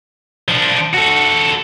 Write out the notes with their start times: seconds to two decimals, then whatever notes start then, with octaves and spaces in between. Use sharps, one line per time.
0.48 F3 D4
0.94 F#4 A4